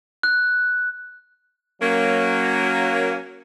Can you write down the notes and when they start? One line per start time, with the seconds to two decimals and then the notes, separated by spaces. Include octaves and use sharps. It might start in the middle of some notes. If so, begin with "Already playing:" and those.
0.23 F#6
1.82 F#3 A#3 C#4